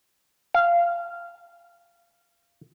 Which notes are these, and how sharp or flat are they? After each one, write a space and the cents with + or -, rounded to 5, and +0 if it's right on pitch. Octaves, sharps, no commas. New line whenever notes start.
F5 -15